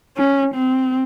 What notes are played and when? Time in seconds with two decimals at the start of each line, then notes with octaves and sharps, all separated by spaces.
0.17 C#4
0.55 C4